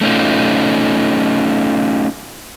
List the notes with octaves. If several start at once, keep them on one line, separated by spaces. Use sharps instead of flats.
A3 C#4 D#4 F4